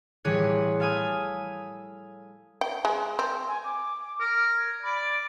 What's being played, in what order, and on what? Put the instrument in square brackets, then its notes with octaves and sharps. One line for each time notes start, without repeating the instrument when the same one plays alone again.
[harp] A1 E3 G3 G#4 C#5 F#6
A4 F5 G#5 B5 D#6
[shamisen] G5
G#3
C4
[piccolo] G#5
D6
[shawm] A#4
[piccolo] G#6
[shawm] D5 [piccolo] B5
[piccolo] D7